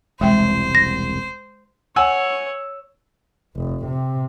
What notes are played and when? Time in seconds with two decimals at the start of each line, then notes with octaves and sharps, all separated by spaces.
0.21 E1 C2 G#3 C5 E5 G5
0.75 A#6
1.96 C#5 F#5 G#5 E6
3.56 F1
3.85 C3